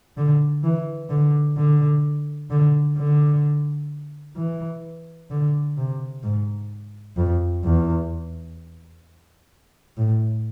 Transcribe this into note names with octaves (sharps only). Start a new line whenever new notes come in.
D3
E3
D3
D3
D3
D3
E3
D3
C3
G#2
F2
E2
A2